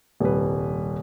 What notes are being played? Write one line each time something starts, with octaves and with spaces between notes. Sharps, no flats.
D#1 C2 B4